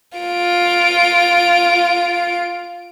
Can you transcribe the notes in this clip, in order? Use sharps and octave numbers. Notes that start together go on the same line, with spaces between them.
F4 D7